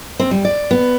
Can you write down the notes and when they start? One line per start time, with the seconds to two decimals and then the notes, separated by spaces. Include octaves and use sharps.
0.19 C4
0.31 G3
0.45 D5
0.71 B3